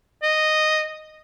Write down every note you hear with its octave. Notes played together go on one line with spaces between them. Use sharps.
D#5